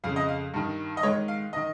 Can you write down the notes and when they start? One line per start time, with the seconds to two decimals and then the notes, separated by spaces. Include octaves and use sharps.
0.04 F2 C#3 F5
0.16 D#5
0.29 F5
0.54 G2 D#3
0.97 D#5
1.03 G#2 D#3 C#5
1.28 F5
1.53 D#3 D#5